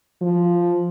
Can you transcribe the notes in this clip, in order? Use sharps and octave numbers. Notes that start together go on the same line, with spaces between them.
F3